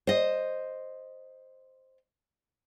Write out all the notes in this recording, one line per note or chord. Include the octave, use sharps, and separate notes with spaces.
C5 D#5